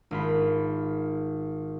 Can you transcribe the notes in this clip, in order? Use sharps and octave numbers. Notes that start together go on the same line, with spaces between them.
G#1 F4 B5